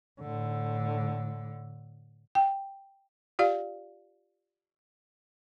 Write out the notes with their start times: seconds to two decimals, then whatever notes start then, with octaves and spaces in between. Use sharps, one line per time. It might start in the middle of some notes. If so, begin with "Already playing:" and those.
0.21 A2 D3
2.35 G5
3.39 F4 G4 D5 F5